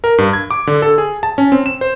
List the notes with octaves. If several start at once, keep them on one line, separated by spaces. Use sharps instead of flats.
A#4
G2
G#6
D6
D3
A4
G#4
A5
C#4
C4
E7
C5